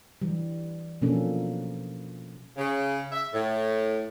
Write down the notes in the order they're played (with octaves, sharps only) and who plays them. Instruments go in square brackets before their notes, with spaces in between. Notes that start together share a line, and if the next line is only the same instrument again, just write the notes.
[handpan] E3 G3
B2 F3 A#3 C#4 D4 A4
[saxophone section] C#3
E5
A2